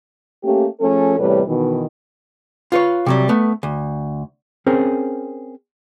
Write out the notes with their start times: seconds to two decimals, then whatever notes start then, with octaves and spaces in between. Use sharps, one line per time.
0.44 A3 A#3 C#4 G4
0.80 F3 A3 C#4 G#4 A4
1.17 E2 A2 C3 G3 B4 C#5
1.46 B2 D#3 E3
2.72 F4 B4 C#5
3.06 C3 F#3 G3
3.29 A3 B3
3.63 D2
4.66 C4 C#4 G#4 A#4 C5